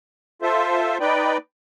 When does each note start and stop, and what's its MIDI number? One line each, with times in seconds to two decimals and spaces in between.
0.42 0.98 65
0.42 0.98 69
0.42 0.98 72
0.42 0.98 76
1.00 1.37 63
1.00 1.37 71
1.00 1.37 74
1.00 1.37 79